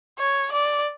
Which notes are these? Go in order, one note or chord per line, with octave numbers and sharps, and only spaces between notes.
C#5
D5